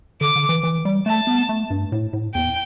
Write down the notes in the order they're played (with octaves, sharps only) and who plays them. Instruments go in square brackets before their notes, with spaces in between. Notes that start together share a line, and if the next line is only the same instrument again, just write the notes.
[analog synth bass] D3 [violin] D6
[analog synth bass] D3
E3
E3
G3
[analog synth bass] A3 [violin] A5
[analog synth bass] B3
A3
G2
A2
A2
[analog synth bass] E2 [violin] G5